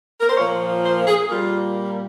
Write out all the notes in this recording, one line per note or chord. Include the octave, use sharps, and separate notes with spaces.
A#4
C5
A#2 F3 A#3 C#5
C5
G#4
A#2 G3 A#3 F4